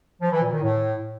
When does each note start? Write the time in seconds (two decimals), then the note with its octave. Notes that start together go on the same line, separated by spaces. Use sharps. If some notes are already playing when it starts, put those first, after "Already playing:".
0.22 F3
0.32 E3
0.42 A#2
0.52 D#3
0.62 A2